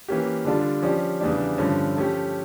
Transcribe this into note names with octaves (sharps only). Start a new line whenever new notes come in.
E3 A#3 C#4 G4
D3 G3 D4 F4 A4
F3 C#4 G4 D5
E2 C#3 E3 G3 D4
G2 D3 F3 A3 C#4
F3 A3 C#4 G4